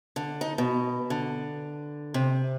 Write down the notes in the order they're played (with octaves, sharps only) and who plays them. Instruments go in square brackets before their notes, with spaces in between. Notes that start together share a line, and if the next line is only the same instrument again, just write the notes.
[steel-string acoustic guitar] D3
D#4
B2
D3
C3